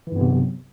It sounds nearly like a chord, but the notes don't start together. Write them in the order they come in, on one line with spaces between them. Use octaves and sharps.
E3 G2 B3 C3 F#3